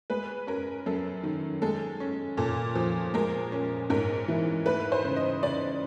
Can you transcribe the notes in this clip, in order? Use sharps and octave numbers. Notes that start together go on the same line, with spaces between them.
G#3 B4
C#4 A#4
F#2 A4
D#3
G#3 A4
C#4
A#2 A4
F3
G#3 A#4
C#4
G#2 A#4
E3
A3 B4
C5
C#3
D#5
C#3 D5